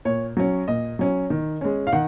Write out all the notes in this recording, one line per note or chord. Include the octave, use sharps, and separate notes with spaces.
A#2 C#5
F#3 C#4
A#2 D#5
F#3 C#4
D#3
G#3 C#4
F5
D#3 F#5